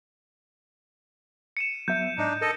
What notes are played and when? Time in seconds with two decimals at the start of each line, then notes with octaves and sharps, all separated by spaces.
1.57 C#7 D#7 E7
1.88 F#3 B3 E5 G6
2.17 G#2 D4 D#4 D#5
2.41 A4 A#4 D#5